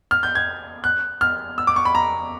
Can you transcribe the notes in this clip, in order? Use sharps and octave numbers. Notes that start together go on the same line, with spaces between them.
F6
G6
G#6
F#6
F6
E6
D6
C#6
B5
A#5